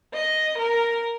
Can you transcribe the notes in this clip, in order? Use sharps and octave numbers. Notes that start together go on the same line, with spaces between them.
D#5
A#4